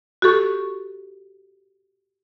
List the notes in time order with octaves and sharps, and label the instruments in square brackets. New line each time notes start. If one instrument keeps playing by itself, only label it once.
[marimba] F#4 G4 A4 C#6